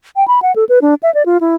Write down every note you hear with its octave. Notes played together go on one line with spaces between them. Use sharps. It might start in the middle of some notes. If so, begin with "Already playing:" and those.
G5
B5
F#5
A4
B4
D4
E5
D5
F4
E4